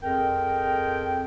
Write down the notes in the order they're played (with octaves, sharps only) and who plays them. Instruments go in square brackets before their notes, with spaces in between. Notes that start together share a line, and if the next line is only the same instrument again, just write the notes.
[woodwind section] F2 G#4 A#4 G5